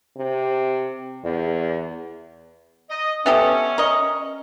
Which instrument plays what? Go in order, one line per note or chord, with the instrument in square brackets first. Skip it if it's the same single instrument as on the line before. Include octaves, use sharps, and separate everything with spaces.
[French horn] C3
E2
[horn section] D#5
[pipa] B3 G4 A4 [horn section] C#4 [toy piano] E5 D#6 E6
[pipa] A#4 D#5